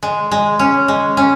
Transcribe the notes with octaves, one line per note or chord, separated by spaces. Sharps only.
G#3
G#3
C#4
G#3
C#4